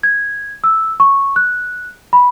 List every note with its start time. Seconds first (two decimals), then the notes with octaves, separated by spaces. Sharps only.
0.03 G#6
0.64 E6
1.00 C#6
1.36 F#6
2.13 B5